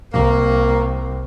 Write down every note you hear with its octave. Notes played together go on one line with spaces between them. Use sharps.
C2 A#3